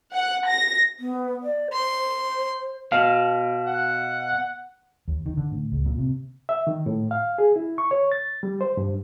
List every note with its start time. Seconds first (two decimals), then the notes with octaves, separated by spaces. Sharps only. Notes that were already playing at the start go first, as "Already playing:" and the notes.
0.13 F#5
0.47 A#6
0.99 B3
1.43 D5
1.73 C5 C6
2.92 B2 F5
3.67 F#5
5.08 D#2
5.26 D#3
5.37 D3
5.52 A2
5.72 C#2
5.86 A#2
5.98 C3
6.49 E5
6.67 D#3
6.86 A2
7.11 F5
7.38 G#4
7.56 E4
7.78 C#6
7.91 C#5
8.12 A6
8.43 G3
8.61 C5
8.77 G2